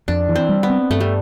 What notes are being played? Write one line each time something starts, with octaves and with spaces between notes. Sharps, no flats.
F2 D4
E3
C4
G3
B3
C4
G2 A3
G3